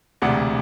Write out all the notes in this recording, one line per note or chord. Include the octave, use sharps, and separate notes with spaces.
E1 D2 C3 D5 F#5